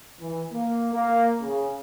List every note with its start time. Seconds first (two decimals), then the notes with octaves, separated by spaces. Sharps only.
0.20 E3
0.52 A#3
0.94 A#3
1.41 C#3